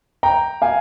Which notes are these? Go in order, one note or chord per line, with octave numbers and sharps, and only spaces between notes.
G5 A#5
F5 G#5